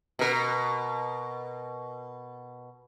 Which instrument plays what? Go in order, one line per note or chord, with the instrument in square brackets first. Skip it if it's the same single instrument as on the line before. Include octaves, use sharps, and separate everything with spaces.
[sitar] B2 A#4